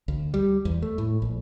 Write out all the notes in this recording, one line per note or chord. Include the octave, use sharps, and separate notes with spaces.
D2
G3
E2
A3
A2
A#1